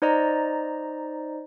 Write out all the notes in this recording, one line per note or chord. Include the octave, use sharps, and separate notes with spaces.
D#4 C5 D5 D#5 A#5